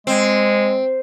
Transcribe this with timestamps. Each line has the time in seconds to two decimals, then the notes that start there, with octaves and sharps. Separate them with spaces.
0.07 G#3 C4